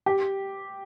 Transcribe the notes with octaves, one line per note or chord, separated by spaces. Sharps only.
G4